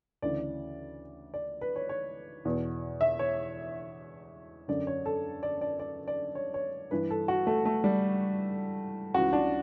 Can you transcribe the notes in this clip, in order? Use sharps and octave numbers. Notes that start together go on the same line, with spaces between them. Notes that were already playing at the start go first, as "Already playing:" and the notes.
D2 C#3 E3 D5
D5
B4
C#5
C#5
E2 B2
E5
C#5
F#2 D3 D5
C#5
A4
D5
D5
D5
D5
C#5
C#5
G2 E3 B4
A4
F#4
A3
A3
G3
C#2 C#3 E3 F#4
D4